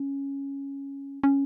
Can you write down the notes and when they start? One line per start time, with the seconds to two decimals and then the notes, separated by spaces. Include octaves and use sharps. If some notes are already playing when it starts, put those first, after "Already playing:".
Already playing: C#4
1.23 C#4